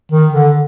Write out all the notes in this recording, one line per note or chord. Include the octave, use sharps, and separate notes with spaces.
D#3
D3